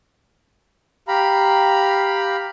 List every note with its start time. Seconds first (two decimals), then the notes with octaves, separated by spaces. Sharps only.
1.08 G4 F5 A#5 B5